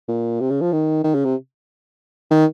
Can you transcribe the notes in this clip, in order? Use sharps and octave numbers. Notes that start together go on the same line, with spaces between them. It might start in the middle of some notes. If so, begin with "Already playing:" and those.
A#2
C3
C#3
F3
D#3
D#3
C#3
C3
D#3